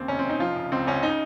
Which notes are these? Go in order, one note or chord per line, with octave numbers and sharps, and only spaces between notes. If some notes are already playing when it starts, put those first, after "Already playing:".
Already playing: D#2 C#3 C4
F1 C#4
C4
F1
D#4
F3 F4
C#3
C#2 C4
C#2 C#4
C#3 D#4